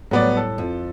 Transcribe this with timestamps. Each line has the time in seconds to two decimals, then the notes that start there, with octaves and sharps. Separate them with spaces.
0.11 A2 F#3 G3 B3 D5
0.37 A4
0.58 F2